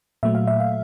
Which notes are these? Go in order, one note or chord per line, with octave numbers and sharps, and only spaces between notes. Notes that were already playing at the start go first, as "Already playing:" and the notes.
A#2 F#3 A3 E5
F5
E5
F5